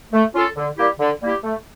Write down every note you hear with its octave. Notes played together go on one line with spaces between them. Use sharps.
A3
C#4 F4 A4
D3
G3 A#3 E4 G4
D3
G3 A#3 E4 G4
A3